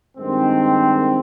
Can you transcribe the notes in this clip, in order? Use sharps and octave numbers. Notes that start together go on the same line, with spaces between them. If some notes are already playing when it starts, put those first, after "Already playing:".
G2 D#3 G#3 C4